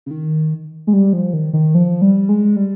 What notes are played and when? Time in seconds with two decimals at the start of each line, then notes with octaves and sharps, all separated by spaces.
0.06 C#3
0.11 D#3
0.87 G#3
0.93 G3
1.13 F3
1.33 D#3
1.53 D#3
1.75 F3
2.02 G3
2.29 G#3
2.56 G3